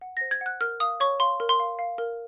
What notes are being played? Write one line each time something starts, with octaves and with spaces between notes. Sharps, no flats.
F#5
A#6
C5
G#6
F#5 F#6
A#4 F6
F5 D#6
C#5 C#6
F5 C6
A#4
C6
F5
F5
A#4